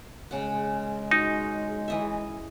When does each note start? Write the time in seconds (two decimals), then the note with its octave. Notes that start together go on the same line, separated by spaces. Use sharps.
0.31 C#3 G#3 F#5
1.11 D#4 F#4
1.88 E3 D#5 E5